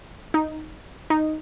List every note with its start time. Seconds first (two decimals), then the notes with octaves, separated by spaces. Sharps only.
0.34 D#4
1.10 D#4